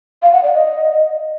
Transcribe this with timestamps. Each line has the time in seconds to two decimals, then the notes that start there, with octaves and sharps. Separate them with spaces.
0.23 F5
0.33 F#5
0.44 D5
0.54 D#5